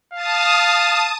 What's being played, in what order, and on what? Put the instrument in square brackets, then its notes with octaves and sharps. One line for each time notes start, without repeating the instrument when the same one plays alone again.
[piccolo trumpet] F5 [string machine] A5 D#6